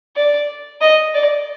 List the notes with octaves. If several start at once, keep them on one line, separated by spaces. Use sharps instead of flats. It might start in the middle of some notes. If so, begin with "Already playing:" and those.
D5
D#5
D5